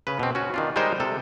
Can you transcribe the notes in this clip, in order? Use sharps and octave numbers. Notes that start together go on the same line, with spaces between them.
C#3 B4
B2 C4
C#4 F#4
D#3 D4 F4
G3 G#3 D#4 A#4 C5 D#5
C3 A4